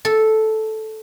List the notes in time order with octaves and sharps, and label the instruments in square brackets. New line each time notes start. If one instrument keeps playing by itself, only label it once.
[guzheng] A4